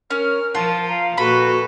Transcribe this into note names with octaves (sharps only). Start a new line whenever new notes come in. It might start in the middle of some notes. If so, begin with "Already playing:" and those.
C#4 A#4 F6
F3 F4 A5
F5 A#5
A#2 F#4 A4 B4 B5